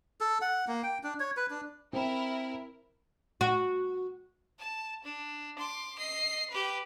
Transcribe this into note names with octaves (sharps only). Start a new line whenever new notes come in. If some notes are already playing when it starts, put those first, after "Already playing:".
A4
F#5
A#3
G5
D4
C#5
B4
D4
C4 E4 A#4
F#4
A5
D4
C6 D6
D#5 C7
G4 B4